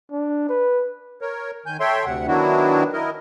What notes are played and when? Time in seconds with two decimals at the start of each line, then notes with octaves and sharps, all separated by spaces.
0.11 D4
0.49 B4
1.21 A#4 C#5
1.66 D#3 G#5 G6
1.80 A4 C#5 E5 G5 C6
2.05 D2 C3 F#5
2.27 D#3 F#3 B3 D4 E4 F#4
2.93 E4 A#4 D#5